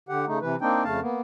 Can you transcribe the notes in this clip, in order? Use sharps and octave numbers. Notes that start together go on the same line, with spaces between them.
D3 G4 F#5
C#3 A3 D#4
C3 E3 B4
A#3 C4 D4 D#4 G5
F2 C#3 A3 F5 A5
A#3 B3